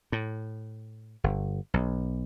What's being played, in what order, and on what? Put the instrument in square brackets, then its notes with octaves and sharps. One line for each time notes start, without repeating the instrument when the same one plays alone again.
[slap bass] A2
G1
B1